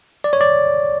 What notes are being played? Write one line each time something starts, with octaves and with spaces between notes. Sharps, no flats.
D5
C#5
D5